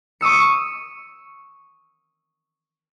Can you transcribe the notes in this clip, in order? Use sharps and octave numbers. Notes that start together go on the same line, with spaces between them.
C#6 D#6 E6 C#7